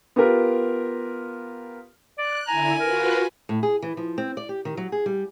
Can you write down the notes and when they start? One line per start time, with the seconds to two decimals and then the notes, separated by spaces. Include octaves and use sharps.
0.16 B3 F4 G4 A#4
2.19 D5 F#6
2.48 D3 E4 G#5 A#5
2.80 F4 F#4 A#4 B4
3.49 A2
3.63 G#4
3.82 E3
3.97 F3
4.18 C4
4.37 D5
4.49 G4
4.65 D#3
4.77 F#3
4.92 G#4
5.06 G3